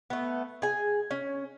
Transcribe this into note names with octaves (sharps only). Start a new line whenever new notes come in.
A3 B3
G#4 G#5
C#4